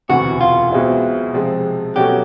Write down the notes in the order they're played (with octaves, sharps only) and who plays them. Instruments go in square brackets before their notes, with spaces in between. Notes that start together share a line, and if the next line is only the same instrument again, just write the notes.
[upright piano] E1 D2 C3 E3 [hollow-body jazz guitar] F#4
[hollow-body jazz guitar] F4
[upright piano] B1 B2 G#3 C4 E4
C3 F3 G#3 C4
[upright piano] B2 F#3 A3 C#4 F#4 [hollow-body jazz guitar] G4